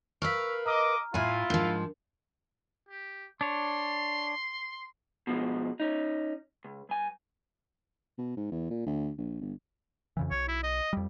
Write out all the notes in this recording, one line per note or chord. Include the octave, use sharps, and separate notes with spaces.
A#4 B4 F5 C#6 E6 B6
D#5 A#5 D6 F6
A2 E4 F4 G#5
G#2 F3 D4 A#4
G4
D4 C#5 C6
B2 F3 G#3
C#4 D#4
C#2
G2 G#5
B2
G#2
E2
A#2
D2
A#1
G1
F2 C#3 E3
B1 C#5
E4
D#5
F2 G3